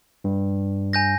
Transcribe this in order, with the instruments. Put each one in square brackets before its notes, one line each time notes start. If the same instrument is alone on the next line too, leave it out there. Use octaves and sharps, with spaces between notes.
[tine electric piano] G2
[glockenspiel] G#5 G6 A#6